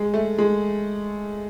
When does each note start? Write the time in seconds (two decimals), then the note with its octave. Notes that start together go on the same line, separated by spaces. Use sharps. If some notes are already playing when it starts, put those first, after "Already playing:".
Already playing: G#3
0.14 A3
0.38 G#3